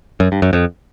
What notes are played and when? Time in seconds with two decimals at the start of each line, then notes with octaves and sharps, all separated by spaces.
0.20 F#2
0.32 G2
0.42 F#2
0.53 F2